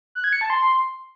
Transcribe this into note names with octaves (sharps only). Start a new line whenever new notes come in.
F#6
G#6
C#7
A5
C6